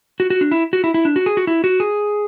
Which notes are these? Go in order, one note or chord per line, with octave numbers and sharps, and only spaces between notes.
F#4
F#4
D4
E4
F#4
E4
E4
D4
F#4
G#4
F#4
E4
F#4
G#4